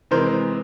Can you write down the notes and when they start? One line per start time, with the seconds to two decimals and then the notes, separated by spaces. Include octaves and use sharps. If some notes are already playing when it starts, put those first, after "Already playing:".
0.11 C3 E3 G#3 A#4 C5